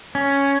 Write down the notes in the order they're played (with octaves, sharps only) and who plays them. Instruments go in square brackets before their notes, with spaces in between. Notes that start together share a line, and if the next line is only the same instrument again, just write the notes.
[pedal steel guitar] C#4